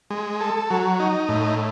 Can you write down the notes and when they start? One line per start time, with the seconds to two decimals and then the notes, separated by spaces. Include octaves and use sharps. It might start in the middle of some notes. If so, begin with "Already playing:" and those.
0.10 G#3
0.41 A4
0.70 F#3
1.00 D#4
1.29 A2